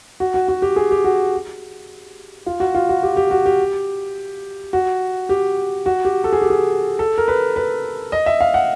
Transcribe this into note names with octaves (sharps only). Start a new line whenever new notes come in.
F#4
F#4
F#4
G4
G#4
G4
F#4
F4
F#4
F4
F#4
G4
G4
F#4
G4
F#4
G4
F#4
G4
A4
G#4
G4
G#4
A4
A#4
B4
B4
D#5
E5
F5
F#5